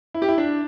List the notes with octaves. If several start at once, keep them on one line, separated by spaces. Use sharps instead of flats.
E4
G4
E4
D4